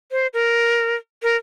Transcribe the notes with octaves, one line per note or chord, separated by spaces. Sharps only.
C5
A#4
A#4